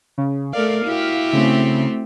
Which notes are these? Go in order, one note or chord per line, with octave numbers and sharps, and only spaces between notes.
C#3
A3 A#4 D5 F5
E4 F#4 G4
C#3 A3 C4